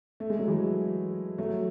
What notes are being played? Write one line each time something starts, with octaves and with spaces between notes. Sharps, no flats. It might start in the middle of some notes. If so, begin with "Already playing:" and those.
A3
G#3
F#3
E3 G#3
F#3 A3